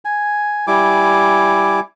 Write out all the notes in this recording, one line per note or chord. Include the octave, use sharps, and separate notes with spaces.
G#5
G3 E4 G#5 D6